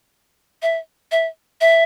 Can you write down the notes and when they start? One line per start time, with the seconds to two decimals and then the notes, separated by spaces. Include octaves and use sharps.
0.62 E5
1.12 E5
1.61 E5